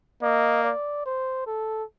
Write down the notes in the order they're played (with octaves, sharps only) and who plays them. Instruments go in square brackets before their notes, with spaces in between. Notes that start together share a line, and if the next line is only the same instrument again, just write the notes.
[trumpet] A#3 [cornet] D#5
[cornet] D5
C5
A4